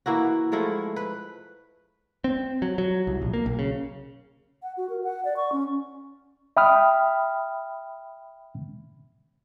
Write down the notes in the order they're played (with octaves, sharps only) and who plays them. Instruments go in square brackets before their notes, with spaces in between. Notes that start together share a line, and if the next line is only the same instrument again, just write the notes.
[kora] E3 A#3 E4 F#4
F3 G#3 A3 E4
B4
[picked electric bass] C4
F#3
F#3
C2
A#1
A#3
B1
C#3
[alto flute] F#5
F#4
A#4
F#5
D5
C#6
C#4
[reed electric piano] E5 G5 B5 D#6 F6